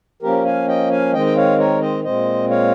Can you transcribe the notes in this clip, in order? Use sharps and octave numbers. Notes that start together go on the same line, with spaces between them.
F3 A#3 C#4 G4 A#4
F5 G#5
D#5 G5
F5 G#5
D#3 G#3 C4 D#5 G5
G5
C#5 F5
A#4 C#5
C5 D#5
A#2 G#3 C4 C5 D#5
C#5 F5